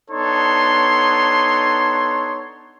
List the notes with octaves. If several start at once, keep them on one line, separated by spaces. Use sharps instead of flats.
B3 D4 D#4 A4 C#5 C6